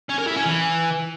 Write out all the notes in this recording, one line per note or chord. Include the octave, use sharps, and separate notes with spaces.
C#4
A#4
E4
C#4
E3